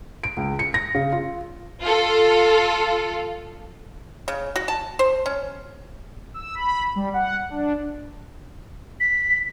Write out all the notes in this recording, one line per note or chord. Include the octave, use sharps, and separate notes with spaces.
D7
C#2
C#7
A#6
C#3
F4
F4 A4
C#3
F#4
A5
C5
C#4
E6
B5
G3
F#5
D4
B6